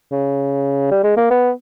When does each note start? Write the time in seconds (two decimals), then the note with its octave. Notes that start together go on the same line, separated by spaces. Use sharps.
0.11 C#3
0.91 G3
1.04 G#3
1.17 A#3
1.30 B3